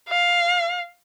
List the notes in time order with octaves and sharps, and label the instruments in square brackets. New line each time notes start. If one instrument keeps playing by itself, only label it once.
[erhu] F5